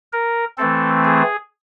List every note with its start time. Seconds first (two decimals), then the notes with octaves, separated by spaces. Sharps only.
0.13 A#4
0.58 E3 A3 C4 A4
1.04 G#4